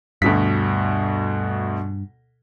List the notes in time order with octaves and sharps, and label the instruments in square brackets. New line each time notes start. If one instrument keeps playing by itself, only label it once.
[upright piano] D2 B2 B6 [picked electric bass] G2